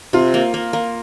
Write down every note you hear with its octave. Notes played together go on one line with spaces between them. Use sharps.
C3 F4
A#3
A#3
A#3